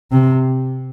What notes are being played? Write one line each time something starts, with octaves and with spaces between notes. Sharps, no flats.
C3